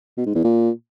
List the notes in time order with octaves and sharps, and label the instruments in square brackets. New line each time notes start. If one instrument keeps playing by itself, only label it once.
[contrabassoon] B2
G#2
E2
A#2